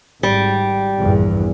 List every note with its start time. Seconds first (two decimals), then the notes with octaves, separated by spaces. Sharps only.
0.23 G#1 G3
0.98 A#1 E2 G2